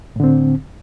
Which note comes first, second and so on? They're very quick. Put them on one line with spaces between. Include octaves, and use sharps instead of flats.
A2 D3 C4